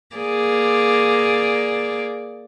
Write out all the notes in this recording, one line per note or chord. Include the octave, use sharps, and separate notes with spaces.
A#3 G#4 D5